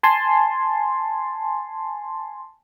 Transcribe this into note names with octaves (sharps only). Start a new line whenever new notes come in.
G#5 A5 C6